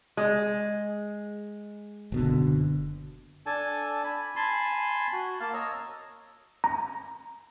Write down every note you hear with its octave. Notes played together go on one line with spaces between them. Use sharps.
G#3
F#1 B2 D3
D4 A4 G#5 A5
G#5 B5
G#5 A5 B5 C6
F#4
A#3 F5 A5
C#5 D#5 A#5 E6
A#5